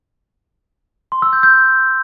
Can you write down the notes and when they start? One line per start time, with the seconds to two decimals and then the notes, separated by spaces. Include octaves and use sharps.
1.12 C6
1.22 E6
1.33 G6
1.43 G6